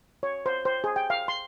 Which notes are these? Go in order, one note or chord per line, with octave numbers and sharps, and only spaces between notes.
C#5
C5
C5
G#4
G5
F5
C6